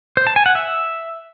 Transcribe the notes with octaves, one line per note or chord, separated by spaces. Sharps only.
C5
A5
G#5
F#5
E5